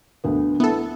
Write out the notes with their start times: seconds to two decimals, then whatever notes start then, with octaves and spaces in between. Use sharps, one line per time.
0.24 D2 D3 B3
0.60 B3 E4 A4